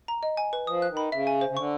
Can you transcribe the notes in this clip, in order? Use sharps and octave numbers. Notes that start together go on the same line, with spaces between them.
A#5
D#5
G#5
B4
F3 D#6
F#6
D#3
B5
C#3 E5
G#5
C5
C#3
D3 C#6